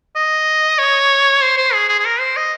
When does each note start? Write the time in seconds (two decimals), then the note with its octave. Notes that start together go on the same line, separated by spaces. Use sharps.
0.16 D#5
0.79 C#5
1.42 C5
1.57 C5
1.74 G#4
1.89 G#4
1.99 G#4
2.05 A#4
2.20 C5
2.36 D#5